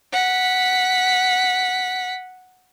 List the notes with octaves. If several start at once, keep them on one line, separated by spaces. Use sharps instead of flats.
F#5 B6